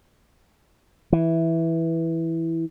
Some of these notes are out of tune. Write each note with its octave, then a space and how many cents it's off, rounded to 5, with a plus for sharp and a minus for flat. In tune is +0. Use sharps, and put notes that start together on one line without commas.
E3 -5